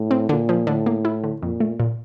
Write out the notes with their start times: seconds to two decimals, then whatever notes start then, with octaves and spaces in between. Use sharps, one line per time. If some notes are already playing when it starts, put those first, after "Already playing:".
Already playing: A2
0.11 C4
0.29 A#2 D3
0.49 F3
0.67 A2 D3
0.86 A#3
1.05 E4
1.24 D3
1.42 F2 A#2
1.60 A3
1.80 A#2